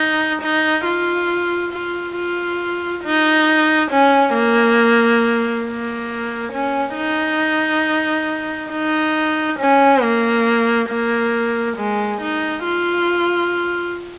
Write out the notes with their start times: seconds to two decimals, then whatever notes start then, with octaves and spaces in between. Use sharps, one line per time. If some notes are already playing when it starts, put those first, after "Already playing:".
Already playing: D#4
0.41 D#4
0.85 F4
1.73 F4
2.16 F4
3.03 D#4
3.91 C#4
4.34 A#3
5.66 A#3
6.52 C#4
6.97 D#4
8.71 D#4
9.59 C#4
10.02 A#3
10.90 A#3
11.77 G#3
12.21 D#4
12.64 F4